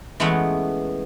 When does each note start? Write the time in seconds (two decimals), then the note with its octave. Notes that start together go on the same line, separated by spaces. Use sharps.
0.20 E3 G#3 A3 B3 C#4 F#5